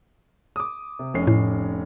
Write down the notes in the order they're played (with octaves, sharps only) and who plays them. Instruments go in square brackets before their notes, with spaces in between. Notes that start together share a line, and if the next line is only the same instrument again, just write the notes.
[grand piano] D6 D#6
C3
F1 C#4 C7
[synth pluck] A2